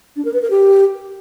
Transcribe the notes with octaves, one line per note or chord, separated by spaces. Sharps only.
D4
A#4
B4
A#4
G4